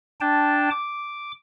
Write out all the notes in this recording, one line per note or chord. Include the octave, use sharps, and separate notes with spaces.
D4 G5 A5
D6